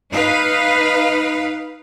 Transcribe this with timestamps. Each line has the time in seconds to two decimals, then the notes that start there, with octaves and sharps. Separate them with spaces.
0.13 D#4 B4 F5